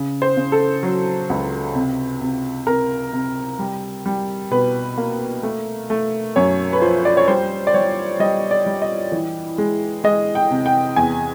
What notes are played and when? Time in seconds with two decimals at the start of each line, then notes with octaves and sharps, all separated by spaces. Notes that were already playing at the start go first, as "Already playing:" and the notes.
Already playing: C#3
0.22 C5
0.37 C#3
0.52 A4
0.83 F#3
1.30 C#2
1.75 C3
2.21 C3
2.67 C3 A#4
3.13 C3
3.59 G3
4.06 G3
4.51 B2 B4
4.98 A#3
5.43 A3
5.90 A3
6.36 F#2 C#5
6.73 B4
6.82 F3 C5
7.05 D5
7.17 C#5
7.28 G3 C5
7.67 D5
7.74 G3 C#5
8.20 G3 D#5
8.51 D5
8.66 G3
8.82 D#5
9.12 E3
9.58 G#3
10.04 G#3 D#5
10.35 G5
10.51 C3
10.66 G5
10.96 E2 G#5